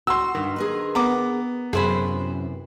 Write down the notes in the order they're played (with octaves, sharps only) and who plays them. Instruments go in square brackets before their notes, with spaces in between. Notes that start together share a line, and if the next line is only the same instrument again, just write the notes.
[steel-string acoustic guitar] F#4 [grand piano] C6 E6
[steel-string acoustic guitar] G2 [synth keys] D#3
[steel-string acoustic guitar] G#4 A#4 B4
[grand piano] B3 [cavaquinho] A#5 D6
[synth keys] F#2 [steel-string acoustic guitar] C3 E3 [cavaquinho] G#4 C5 B5